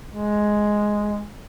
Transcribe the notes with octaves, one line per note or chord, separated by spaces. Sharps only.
G#3